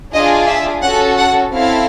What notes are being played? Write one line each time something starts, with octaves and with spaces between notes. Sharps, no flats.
D4 F4 G#4 D#5
E5
C#4 F#4 A4 F#5
F#5
C4 E4 A4 F5